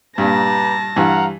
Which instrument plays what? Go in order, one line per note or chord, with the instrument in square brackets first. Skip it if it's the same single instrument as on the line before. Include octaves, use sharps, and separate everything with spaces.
[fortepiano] G2 A#2 [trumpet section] G4 B4 A#5 [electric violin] A5 A#6
[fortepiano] G2 E3 [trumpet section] F5 F#5 A#5